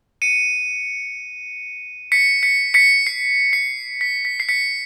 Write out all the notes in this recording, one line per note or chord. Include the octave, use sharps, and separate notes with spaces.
C#7 D#7
B6 C#7
B6 C#7
B6 C#7
C7
C7
B6
B6
C7
B6 C#7